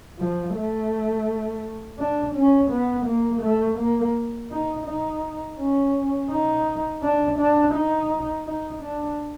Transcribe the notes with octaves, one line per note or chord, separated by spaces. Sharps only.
F3
A3
D4
C#4
B3
A#3
A3
A#3
D#4
D#4
C#4
D#4
D4
D4
D#4
D#4
D4